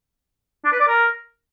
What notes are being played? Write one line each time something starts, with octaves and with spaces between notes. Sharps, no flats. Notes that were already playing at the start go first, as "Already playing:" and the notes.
D4
B4
D5
A#4